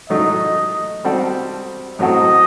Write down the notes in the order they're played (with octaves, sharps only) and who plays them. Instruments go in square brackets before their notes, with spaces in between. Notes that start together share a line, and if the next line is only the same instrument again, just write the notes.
[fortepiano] A2 F#3 A3 D#4 [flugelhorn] D#5
[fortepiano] G3 C4 F#4 A4
[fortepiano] A2 F#3 C4 F#4 A4 [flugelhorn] D#5